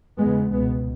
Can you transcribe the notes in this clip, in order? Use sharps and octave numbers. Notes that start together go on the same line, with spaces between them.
E2 C#3 G#3 B3
C#2 B2 G#3 B3